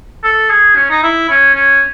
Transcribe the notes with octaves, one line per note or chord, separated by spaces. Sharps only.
A4
G#4
C#4
D#4
E4
C#4
C#4